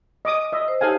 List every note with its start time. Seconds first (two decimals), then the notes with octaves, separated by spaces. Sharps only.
0.25 D#5 D6 D#6
0.52 D#5 E5
0.68 C5
0.81 D#4 G4 A4 C#5 F5 G#5